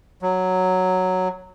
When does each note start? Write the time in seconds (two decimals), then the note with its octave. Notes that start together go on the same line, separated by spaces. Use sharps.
0.22 F#3